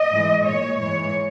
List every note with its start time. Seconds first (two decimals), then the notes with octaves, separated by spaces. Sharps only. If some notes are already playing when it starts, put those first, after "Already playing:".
Already playing: D#5
0.11 G#2 E3 G#3
0.44 A#2 G#3 C#5
0.78 G#2 E3 G#3 C#5